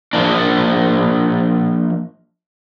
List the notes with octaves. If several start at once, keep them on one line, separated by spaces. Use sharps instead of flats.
F3 A#3 D4